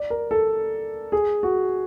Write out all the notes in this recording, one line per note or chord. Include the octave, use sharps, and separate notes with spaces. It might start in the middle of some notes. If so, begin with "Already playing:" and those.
Already playing: D5
A#4
A4
G#4
F#4